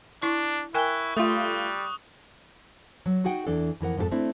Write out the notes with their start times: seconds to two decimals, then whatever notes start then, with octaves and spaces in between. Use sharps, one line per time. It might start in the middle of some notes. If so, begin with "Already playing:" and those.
0.22 D4 E4 C#6
0.74 E4 A#4 G5 G#5 C#6 F#6 G7
1.17 G3 A3 F4 D#6
3.06 F#3
3.24 D#4 F#4 G#4 F#5 G5
3.47 E2 E3 D4 A4
3.81 F2 E3 A#4 F#5
3.97 F2 G#2 F3 G4 A4
4.11 A3 C4 D4 E4